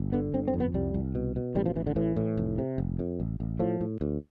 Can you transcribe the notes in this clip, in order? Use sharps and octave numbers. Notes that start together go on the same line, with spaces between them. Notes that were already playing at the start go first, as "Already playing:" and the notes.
Already playing: G1
D3 B3
G1 C4
C4
F2
B3
C2 G3
C2
B2
B2
A1 G3
F3
A1 E3
D3
A2 E3
A2
F1
C3
F1
F2
A1
A1
A2 F3
A2
D2